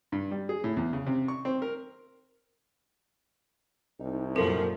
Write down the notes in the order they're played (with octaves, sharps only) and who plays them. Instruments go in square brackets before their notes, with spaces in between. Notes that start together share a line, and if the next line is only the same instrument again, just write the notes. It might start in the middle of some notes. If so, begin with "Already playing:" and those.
[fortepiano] G2
G3
G#4
A2
E2
C#3
C3
C#6
C4
A#4
[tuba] C2 [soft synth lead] D#4
[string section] F#2 A#2 F3 [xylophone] A4 [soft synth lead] A#4